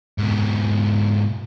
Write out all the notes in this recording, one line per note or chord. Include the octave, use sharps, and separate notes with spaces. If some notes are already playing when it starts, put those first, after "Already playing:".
G#2 B2